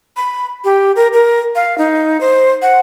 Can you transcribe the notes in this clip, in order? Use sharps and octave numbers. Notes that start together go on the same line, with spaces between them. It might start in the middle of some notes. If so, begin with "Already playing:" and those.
B5
G4
A#4
A#4
F5
D#4
C5
F#5